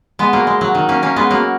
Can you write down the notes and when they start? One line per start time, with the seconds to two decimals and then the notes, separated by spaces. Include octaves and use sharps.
0.19 G#3 B3
0.33 F#3 A#3
0.47 G#3
0.61 F#3
0.75 D#3
0.89 A#3 C#4
1.03 A#3 C#4
1.16 G#3 B3
1.31 F#3 A#3